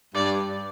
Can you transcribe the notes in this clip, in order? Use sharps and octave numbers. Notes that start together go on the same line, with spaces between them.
G2 D5